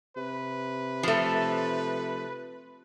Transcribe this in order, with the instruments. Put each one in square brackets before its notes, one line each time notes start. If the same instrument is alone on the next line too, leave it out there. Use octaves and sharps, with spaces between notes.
[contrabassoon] C3 [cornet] B4
[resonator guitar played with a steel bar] F3 A3